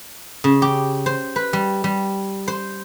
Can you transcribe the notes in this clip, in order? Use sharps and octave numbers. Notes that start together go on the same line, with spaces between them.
C#3
G4
C5
B4
G3
G3
C5